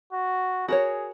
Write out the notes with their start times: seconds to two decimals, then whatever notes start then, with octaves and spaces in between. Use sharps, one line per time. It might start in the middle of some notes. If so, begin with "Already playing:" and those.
0.13 F#4
0.68 F#4 G#4 A#4 C#5